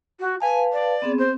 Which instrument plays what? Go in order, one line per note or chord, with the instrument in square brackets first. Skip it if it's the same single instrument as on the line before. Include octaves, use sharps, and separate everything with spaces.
[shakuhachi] F#4
[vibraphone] B4 F5 A5 [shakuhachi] G#5
[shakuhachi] D5
[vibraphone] B3 C4 G#4
[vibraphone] C4 [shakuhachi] C5